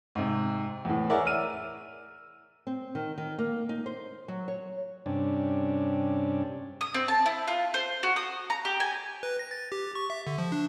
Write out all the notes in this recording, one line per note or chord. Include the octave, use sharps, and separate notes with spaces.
G#2 C3
E2 A2
G#4 A#4 C#5 D5 E5 F#5
E6 F6 D#7
C4
D#3
D#3
A#3
D#4
C5
F#3
C#5
G2 C3 C#4 D4
D#6
C4
A5
E4
F4
C5
F#4
D#6
A#5
G4
G#5
B4
A#6
A6
G4
C#6
E5
D3
F3
D4